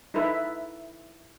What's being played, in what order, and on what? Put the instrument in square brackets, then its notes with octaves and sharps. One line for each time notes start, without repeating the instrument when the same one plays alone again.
[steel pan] D#4 E4 A4 B4 E5